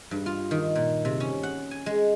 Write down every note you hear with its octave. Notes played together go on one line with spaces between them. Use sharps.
G2
F4
D#3
A#2
C3
C#4
F#5
G#5
G#3